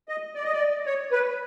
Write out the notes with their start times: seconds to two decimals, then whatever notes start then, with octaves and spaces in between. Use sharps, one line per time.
0.09 D#5
0.35 D5
0.44 D#5
0.53 D5
0.86 C#5
1.12 B4